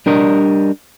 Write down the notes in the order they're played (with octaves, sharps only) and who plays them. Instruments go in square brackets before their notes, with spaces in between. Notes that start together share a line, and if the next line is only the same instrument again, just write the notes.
[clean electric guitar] G3 D4 A#4 D#5